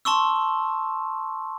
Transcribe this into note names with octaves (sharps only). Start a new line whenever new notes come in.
A5 C6 C#6 E6